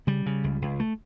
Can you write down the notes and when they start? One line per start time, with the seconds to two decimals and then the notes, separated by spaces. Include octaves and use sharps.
0.07 C#3 G3
0.26 C#3
0.44 C#2
0.62 C#2
0.80 A3